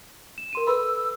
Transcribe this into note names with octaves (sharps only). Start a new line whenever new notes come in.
E7
A#4 C6 D#7
A4 B4 B5 E6